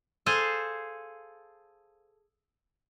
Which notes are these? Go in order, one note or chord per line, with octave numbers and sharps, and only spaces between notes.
G#4 A4 C5 F5 G#5 A5